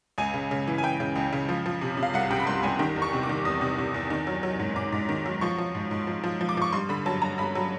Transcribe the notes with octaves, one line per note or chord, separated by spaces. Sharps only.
C#2 G#5
C#3
C#3
E3
G#5
E3 G5
C#3
C#2
C#3
F3
F3
C3
C3
F5
C2 F#5
C3 G5
B5
C2 C6
C2 G#5
D#3 G5
E2
C#6
C3
D6
D#3
E2 D#6
C3
C3
E2
D#3
F#3
F#3
G#2
G#2 D6
G#2
D#3
F#3
F3 C#6
F3
G#2
G#2
F3
F3
F3
D6
F3 C#6
G2 C6
D3 B5
F#3 A5
G2 A#5
G2 B5
F#3